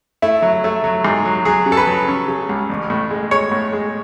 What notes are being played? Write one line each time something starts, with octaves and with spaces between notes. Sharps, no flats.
A3 E4
F#3
A3
F#3
G#2
F#3
F#3 G#4
C#3
A4
B4
F#3
C#4
C#3
C#2
A1
A2
G#3
G#3 C#5
A2
G#3